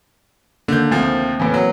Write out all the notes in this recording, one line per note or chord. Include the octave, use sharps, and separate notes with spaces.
D3 D#3 A#3 G6
D2 F3 A3 A#3 C4
E2 A2 E3 A#3 B3
F#3